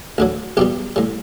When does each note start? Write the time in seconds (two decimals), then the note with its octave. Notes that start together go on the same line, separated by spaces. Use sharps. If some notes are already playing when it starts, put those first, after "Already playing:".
0.18 D2 D3 F#3
0.57 B1 B2 G3 G4
0.96 A2 G3